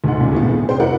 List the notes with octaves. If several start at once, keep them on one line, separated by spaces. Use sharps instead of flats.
D2 G#2 D#4 F#5
C#2 A#2 C#3
G1 A2 B3
G#4
F1 C5 G5
E4 F#4 A#4 B4 D5 F#5